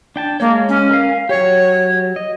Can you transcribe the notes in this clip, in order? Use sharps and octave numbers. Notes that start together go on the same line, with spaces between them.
D4 G5 A5
G#3 A#3 C#5
C#4
A#4 F5
F#3 G4 C#5
D#5